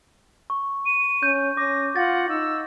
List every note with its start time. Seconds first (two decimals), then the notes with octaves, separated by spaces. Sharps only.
0.50 C#6
0.86 D#7
1.23 C#4 G6
1.57 C#4 D6 A#6
1.96 F4 F#5 A6 A#6
2.29 D#4 E6